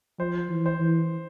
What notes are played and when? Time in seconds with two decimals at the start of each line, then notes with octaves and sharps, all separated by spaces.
0.20 F3 C5
0.49 E3
0.66 C5
0.80 E3